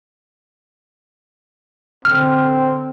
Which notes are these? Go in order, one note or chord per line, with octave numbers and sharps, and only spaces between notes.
D3 C4 F6